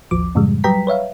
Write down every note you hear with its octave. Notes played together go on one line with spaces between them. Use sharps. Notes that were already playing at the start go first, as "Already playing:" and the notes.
A1 D#2 F3 D6
F#2 A2 C#3 F3 G3 G#3
F#3 G3 B4 G5 A#5 B6
B4 C#5 E5 F5